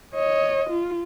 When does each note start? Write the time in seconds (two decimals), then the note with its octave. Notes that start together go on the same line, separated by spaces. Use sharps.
0.14 C#5 D#5
0.70 F4